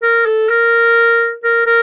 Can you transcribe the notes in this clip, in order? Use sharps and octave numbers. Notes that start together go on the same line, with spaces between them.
A#4
A4
A#4
A#4
A#4